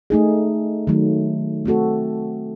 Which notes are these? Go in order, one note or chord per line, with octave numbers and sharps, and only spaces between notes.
A3 D#4 G#4
D#3 F#3 A3
A3 C4 F#4 A4